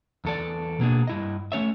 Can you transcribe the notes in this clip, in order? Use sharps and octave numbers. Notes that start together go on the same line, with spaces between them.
E2 A4 D5
B2 A#3 D4 G#4
G2 E4 D#5
A3 C#4 C#5 E5